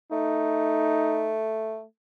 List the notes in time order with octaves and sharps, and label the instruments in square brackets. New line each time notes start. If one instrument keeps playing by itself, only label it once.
[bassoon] A3 [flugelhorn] D#4